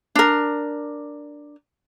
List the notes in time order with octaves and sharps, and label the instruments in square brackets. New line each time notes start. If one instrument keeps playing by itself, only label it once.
[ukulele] D4 A#4